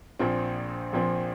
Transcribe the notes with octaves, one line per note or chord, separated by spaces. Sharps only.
A#1 A#2 F3 C4
A#1 A#2 F3 C4